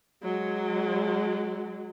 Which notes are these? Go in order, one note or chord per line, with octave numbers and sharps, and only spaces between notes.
F#3 G#3